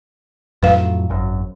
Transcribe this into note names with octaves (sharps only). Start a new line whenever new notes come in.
F2 A2 F#3 B4 F5
G#1 F#2